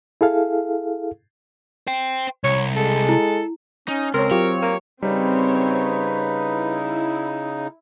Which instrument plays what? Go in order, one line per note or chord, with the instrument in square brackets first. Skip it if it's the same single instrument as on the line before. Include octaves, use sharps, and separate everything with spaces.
[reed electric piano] E4 G#4 A4 F5
[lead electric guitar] C5 G5
[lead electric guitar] C2 [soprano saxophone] C#5
[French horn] G#3 [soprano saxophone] A4
[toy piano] E4
[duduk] C#4 [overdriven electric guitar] D#4
[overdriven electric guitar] C#2 [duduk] C4 [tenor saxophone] A#4 [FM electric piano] C#5 C6
[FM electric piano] F#3 F4 G4 [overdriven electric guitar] C#5
[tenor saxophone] A#3
[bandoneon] C#3 D#4 [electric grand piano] G3 [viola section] C4 C#5 [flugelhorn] B4
[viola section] E4